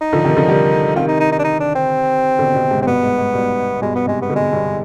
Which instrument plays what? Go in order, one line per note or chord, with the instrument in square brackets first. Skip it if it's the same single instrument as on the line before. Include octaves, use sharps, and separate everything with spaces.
[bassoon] D#4
[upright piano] D3 F3
C3 D#3
D3 F3
D#3 G3
[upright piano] C3 D#3 [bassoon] F4
[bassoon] D#4
D#4
D#4
D4
D#4
D4
C4
[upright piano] B2 D3
B2 D3
G#2 C3
[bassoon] C4
[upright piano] G2 B2 [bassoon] B3
[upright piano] G#2
G#2
G2 B2
[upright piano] G2 B2 [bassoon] G#3
[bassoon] B3
[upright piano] G#2 C3 [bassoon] G#3
[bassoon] B3
[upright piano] B2 D3
[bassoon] G#3
[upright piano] G2 B2